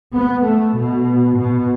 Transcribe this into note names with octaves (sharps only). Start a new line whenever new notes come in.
B3
A3
B2
B2